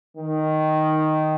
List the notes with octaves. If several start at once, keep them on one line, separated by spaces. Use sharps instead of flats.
D#3